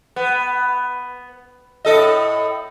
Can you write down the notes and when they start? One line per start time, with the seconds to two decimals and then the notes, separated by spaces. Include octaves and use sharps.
0.16 B3
1.85 A2 A4 D#5